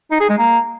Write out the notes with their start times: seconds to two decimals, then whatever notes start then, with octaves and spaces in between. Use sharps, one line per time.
0.11 D#4
0.20 G#4
0.29 G#3
0.38 A#3